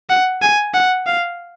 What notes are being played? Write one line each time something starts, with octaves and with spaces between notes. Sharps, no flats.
F#5
G#5
F#5
F5